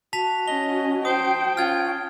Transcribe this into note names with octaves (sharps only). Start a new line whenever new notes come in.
F#4 A5 B6 F7
C#4 D#5 G7
C5 G5 D#6
C#4 F4 F6 G#6